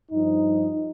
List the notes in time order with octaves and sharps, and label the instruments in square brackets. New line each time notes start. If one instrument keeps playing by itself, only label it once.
[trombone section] G2 F3 D#4